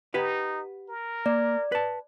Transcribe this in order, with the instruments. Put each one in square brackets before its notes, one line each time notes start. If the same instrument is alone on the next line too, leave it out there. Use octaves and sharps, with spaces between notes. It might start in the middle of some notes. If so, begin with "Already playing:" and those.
[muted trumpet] D#4 [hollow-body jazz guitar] G4 B4 F#5
[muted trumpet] A#4
[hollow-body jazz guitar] A#3 [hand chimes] D5
[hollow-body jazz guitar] B4 A5